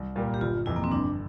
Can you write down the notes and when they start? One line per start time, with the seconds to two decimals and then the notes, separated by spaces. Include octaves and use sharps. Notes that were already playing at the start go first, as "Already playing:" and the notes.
Already playing: C2
0.16 A#2 G3 A#3
0.34 G4
0.41 G1 F4
0.66 F2 C3 E3 E4
0.76 A#3
0.84 C4
0.91 G1 D4